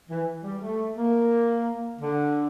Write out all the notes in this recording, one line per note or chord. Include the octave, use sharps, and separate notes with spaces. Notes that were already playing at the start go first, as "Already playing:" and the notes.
E3
G3
A3
A#3
D3